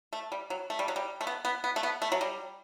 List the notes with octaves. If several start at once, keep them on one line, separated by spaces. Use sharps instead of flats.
A3
G3
F#3
A3
G3
F#3
G3
A3
B3
B3
B3
A3
B3
A3
F#3
G3